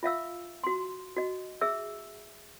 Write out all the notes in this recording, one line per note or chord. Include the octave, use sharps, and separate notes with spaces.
F4 E5 F5 E6
F#4 C6
F#4 D#5
G#4 E5 E6